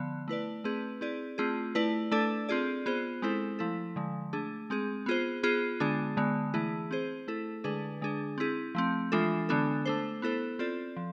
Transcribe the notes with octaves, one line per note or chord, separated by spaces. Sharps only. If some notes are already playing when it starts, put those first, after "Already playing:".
Already playing: D3 F3 B3
A3 E4 B4 D5
A3 C4 G#4 B4
C4 E4 G#4 D5
A3 C4 F4 G#4
A3 E4 B4 D5
A3 D4 A4 D5
C4 F4 G#4 D5
B3 F4 G#4 C5
G#3 C4 E4 A4 C5
F3 A3 E4 A4
D3 F3 G#3
A3 D4 G#4
G#3 C4 G#4
B3 F4 G#4 C5
B3 F4 G#4
D3 G#3 B3 D4 G#4
D3 G#3 B3
E3 A3 E4 G#4
C4 G#4 C5
A3 E4 A4
D3 G#3 D4 G#4 B4
D3 G#3 D4 G#4
C4 E4 G#4
F3 A3 C4
E3 G#3 D4 F4 A4
D3 G#3 B3 D4 A4
A3 D4 A4 C5
B3 E4 A4 C5
C4 F4 A4 D5
F3